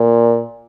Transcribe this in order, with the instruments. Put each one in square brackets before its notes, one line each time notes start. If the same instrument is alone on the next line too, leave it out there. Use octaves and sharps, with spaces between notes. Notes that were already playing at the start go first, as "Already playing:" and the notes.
Already playing: [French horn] A#2